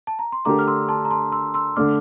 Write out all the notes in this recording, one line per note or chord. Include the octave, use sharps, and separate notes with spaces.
A5
A#5
C6
D3 A3 D4 G4 A#4 A#5 D6
F6
C6 E6
A5 C6
A#5
A5 C6
C6 E6
C6 E6
D3 A3 D4 D6 F6